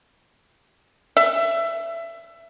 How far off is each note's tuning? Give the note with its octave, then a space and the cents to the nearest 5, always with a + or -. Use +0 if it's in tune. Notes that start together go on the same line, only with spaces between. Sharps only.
E5 +20